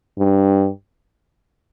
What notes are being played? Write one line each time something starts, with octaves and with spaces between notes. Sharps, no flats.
G2